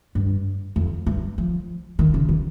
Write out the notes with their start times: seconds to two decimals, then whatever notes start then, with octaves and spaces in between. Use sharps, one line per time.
0.15 G2
0.76 F2
1.07 G2
1.38 F3
1.99 D#3
2.14 C#3
2.29 D#3